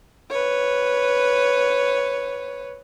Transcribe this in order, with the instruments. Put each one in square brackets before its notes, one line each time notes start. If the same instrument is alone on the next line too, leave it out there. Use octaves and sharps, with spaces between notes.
[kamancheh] B4 C#5